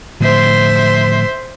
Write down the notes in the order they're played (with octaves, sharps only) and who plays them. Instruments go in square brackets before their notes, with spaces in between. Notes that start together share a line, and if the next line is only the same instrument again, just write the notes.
[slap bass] A2 D3 F3 [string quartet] C5 E5 C6